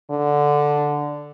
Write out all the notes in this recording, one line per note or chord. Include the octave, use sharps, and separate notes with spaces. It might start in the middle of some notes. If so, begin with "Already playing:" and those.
D3